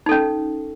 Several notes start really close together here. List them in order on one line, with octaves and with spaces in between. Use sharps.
D#4 A4 C#4